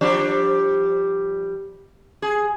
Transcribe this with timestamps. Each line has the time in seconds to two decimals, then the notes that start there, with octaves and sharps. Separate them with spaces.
0.01 F3 G3 D4
2.22 G#4